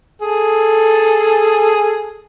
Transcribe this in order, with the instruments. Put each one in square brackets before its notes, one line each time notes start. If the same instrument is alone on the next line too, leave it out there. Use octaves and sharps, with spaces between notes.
[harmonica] G#4 A4